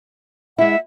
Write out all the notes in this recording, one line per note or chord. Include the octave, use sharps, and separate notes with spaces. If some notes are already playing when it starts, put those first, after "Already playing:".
G#3 E4 E5 F#5